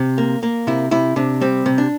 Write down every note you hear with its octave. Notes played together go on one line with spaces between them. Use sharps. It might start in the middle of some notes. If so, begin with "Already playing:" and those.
Already playing: C3
A#3
A#3
C3 E4
C3 E4
C3 D4
G3 C4
C3
D4